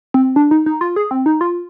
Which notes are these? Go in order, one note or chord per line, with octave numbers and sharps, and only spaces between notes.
C4
D4
D#4
D#4
F4
G#4
C4
D#4
F4